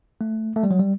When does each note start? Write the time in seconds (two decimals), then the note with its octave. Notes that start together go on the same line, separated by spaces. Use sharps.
0.21 A3
0.56 A3
0.63 G3
0.71 F#3
0.79 G3